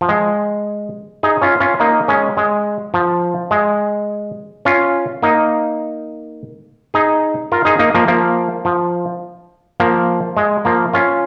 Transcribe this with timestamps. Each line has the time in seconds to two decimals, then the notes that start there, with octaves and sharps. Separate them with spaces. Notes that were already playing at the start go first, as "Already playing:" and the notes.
0.01 F3
0.09 G#3
1.23 D#4 G#4
1.42 C#4 F4
1.60 C#4 F4
1.80 A#3 D#4
2.08 G#3 C#4
2.37 G#3
2.94 F3
3.51 G#3
4.65 C#4 F4
5.22 A#3 D#4
6.94 D#4 G#4
7.52 F4 A#4
7.65 D#4 G#4
7.79 A#3 D#4
7.94 F3 A#3
8.08 F3 A#3
8.65 F3
9.80 F3 A#3
10.37 G#3
10.65 F3 A#3
10.94 C#4 F4